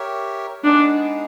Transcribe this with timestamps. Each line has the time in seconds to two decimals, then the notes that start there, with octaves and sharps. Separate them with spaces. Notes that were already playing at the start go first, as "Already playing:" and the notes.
Already playing: G4 A#4 C#5 E5
0.63 G#3 B3 D4 D#4 G#4